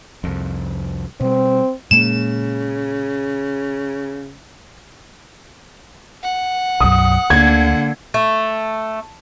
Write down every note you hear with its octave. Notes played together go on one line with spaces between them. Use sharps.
C2 F2
B2 G3 C4
A#2 C#3 G#3 A#3 E7
F#5
B1 F#2 D#6
D2 D3 A#3 G#6
A3